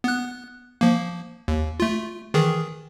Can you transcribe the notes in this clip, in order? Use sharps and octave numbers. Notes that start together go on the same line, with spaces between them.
B3 F#6
F3 A#3
D#2
A3 F4
D#3 E3 G#4